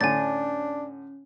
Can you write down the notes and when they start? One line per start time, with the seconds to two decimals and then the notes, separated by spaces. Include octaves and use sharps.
0.01 A2 D3 C#4 D4 G#5 A6